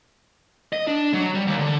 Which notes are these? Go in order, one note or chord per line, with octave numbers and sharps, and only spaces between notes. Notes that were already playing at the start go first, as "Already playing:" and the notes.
D#5
D4
F#3
G3
D#2
D3